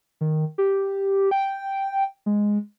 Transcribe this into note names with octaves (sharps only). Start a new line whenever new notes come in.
D#3
G4
G5
G#3